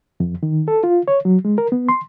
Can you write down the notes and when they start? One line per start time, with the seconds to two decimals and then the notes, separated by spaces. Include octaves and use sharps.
0.20 F2
0.43 D#3
0.68 A4
0.84 F4
1.08 C#5
1.25 F#3
1.45 G#3
1.58 A#4
1.72 B3
1.89 C6